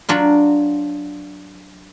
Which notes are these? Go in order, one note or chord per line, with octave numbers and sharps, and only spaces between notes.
F#3 D4 F4